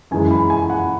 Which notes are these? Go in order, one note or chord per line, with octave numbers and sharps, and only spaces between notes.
F#2 E3 G#3 G#5
B5
G#5
F#5